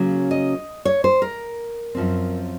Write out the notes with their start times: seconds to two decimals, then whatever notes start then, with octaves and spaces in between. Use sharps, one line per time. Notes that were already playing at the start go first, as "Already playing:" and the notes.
Already playing: C#3 F#3 A#3 C#4
0.31 D#5
0.85 C#5
1.04 C5
1.22 A#4
1.95 F#2 F3 C4